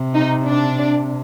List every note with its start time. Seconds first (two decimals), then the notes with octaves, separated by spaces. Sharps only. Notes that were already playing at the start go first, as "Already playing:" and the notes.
Already playing: C3
0.14 D#4
0.46 D4